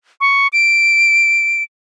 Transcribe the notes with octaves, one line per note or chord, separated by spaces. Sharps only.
C#6
D7